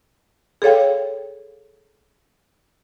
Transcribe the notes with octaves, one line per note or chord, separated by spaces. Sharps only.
G#4 A4 C#5 F5 G5